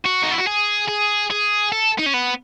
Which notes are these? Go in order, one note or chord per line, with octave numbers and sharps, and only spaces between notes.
F#4
D#4
E4
F#4
G#4
G#4
G#4
A4
D#4
C#4
B3